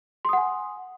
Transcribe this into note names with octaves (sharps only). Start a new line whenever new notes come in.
F#5 G#5 C6 D#6